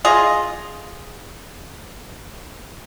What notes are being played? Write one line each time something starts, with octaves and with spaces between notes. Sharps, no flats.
F4 G#4 D#5